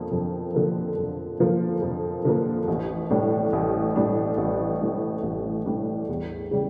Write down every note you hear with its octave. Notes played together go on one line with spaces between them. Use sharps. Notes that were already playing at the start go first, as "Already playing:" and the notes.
Already playing: F2 D3 F3 A#3
F2
D3 F3 A#3
F2
D3 F3 A#3
F2
D3 F3 A#3
A1
A2 G3 D4
A1
A2 G3 D4
A1
A2 G3 D4
A1
A2 G3 D4
E2
C#3 G3